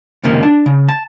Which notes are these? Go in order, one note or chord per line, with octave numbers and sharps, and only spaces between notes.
C#2 F#2 C3 D#3 A#3 E5
D4 A5
C#3
A5